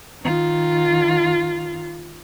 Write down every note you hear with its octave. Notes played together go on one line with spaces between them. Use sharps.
D#3 F4